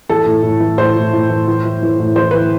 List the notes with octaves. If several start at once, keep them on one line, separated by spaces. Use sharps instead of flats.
E3 A4
A2
A2
E3
A2 C5
A2
A2
E3
E3
E3
E3
A2
E3 C5
E3 B4